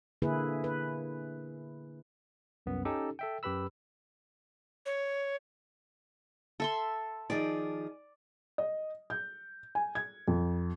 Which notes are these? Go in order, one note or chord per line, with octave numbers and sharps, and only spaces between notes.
D3 A#3 E4 G#4 B4
B4
C2 F#2 B3
C#4 D#4 G4 A4
A4 E5 G5
F#2 G4 B4 B5 E6
C#5
A4 E5 C6
D#3 F3 G#4 D5
D#5
G6
G#5
G#6
F2